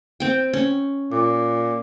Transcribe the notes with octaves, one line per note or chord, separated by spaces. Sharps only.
C4 G5
C#4
A#2 D6